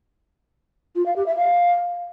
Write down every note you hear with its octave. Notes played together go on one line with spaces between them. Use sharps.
F4
F5
G4
E5
F5